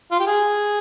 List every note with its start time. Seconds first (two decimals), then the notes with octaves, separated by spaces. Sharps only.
0.11 F4
0.20 G4
0.27 G#4